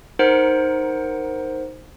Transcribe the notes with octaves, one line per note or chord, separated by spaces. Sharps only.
D#4 A#4 C5 F#5 C#7 D7